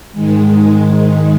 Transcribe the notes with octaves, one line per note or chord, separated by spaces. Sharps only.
G#2 D#3 G#3